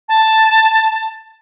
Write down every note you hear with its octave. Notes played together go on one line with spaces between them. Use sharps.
A5